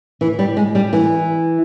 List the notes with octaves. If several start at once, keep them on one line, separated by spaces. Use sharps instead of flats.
E3
G3
G#3
G3
E3